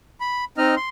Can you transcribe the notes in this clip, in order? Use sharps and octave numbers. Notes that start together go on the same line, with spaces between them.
B5
C4 D#4 D#5 F6
C6